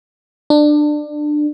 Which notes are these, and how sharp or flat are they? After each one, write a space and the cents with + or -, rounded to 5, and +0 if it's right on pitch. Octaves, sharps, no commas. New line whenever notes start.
D4 +20